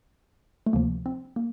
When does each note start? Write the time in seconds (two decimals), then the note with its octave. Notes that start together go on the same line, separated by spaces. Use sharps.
0.66 A3
0.73 D2 C3 F3 A#3
1.06 C4
1.36 A#3